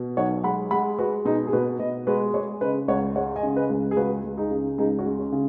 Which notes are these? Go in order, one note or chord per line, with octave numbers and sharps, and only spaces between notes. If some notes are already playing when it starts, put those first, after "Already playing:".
Already playing: B2
B1 C#5 F#5
G#3 F#5 B5
G#3 F#5 B5
G#3 F#4 B4
B2 D#4 G#4
G#4
B2 F#4 B4
B2 B4 D#5
G#3 F#4 B4
G#3 G#4 C#5
C#3 B4 D#5
C#2 C#5 F#5
G#3 C#5 F#5
D#5 G#5
C#3
B4 D#5
C#2
G#4
C#2 F#4 B4
C#2
D#4 G#4
C#3
C#2 D#4 G#4
C#4 F#4
G#3
C#4
C#3